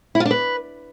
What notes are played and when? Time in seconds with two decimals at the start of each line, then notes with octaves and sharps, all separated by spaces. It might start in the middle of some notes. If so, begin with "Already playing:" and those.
0.15 E4
0.20 F4
0.25 D4
0.31 B4